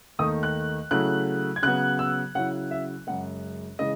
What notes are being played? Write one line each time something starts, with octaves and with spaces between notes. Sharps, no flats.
D#2 D#3 A3 D#6
F#6
C#3 F#3 A3 E4 F#6
G#6
C#3 F#3 B3 F#6
E6
C#3 F#3 C#4 E4 F#5
E5
F#2 C#3 G#3 F#5
C#3 E3 G#3 D#5